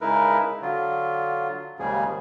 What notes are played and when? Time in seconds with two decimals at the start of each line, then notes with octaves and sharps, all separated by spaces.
0.01 C#3 G#3 D#4 E4 A#4 B4
0.62 D3 F#3 F4
1.79 D#2 G#2 C#3 F3 G3 G#4